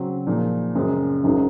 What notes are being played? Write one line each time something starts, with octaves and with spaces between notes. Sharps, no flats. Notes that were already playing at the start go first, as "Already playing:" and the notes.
Already playing: C#3 F#3 C4
A#2 F3 G#3 D#4
F#2 C#3 G#3 C4
G#1 F#2 D#3 G#3